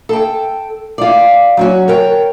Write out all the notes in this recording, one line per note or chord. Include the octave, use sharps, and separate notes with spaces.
A4 G5
F4 D5
F#3 C#4 F#4
A#4 C#5 G5